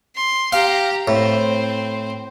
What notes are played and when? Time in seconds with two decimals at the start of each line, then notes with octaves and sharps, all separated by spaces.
0.16 C6
0.53 G4 F5 A#5
1.08 A2 C4 C5